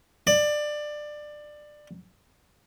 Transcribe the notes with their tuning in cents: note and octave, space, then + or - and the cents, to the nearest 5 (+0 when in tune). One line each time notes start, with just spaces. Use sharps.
D5 +20